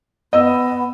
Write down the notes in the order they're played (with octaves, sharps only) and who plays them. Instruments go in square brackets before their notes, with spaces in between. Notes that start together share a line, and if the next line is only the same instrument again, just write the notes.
[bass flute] B3 [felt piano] D#5 E6